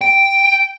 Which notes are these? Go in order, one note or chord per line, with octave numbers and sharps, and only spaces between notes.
G5